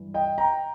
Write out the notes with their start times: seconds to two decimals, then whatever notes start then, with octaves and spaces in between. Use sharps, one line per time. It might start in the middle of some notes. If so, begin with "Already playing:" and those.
Already playing: G2 E3 G3
0.14 D#5 G5
0.38 G5 A#5